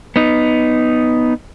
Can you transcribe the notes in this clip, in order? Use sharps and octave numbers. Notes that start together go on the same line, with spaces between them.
B3 D#4